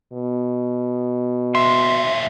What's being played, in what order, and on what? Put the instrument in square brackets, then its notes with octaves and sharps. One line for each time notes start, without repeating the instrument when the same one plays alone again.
[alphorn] B2
[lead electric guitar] D#2 E5 [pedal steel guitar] C6